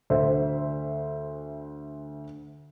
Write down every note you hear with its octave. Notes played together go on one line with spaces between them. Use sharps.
D2 C5 E5